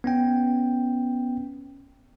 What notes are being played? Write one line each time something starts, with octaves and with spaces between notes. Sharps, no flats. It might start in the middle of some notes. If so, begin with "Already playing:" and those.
B3 C#4 G5